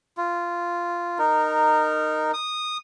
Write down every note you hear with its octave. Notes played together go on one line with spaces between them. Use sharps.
F4
D#4 A#4
D#6